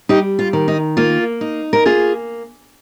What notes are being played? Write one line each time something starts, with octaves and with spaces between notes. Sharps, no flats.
G3 D#4 G4
F4
D#3
D#4
A#3 F4
D#4
A#4
A#3 F4 G#4